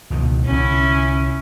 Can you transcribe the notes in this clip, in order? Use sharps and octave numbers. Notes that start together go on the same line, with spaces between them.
C#2 B2 D#3
C2 D3 C#4 E4